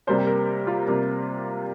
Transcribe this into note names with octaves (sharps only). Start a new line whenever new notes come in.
C3 G3 A#3 C5
G4
A#4
F4
C3 G3 A#3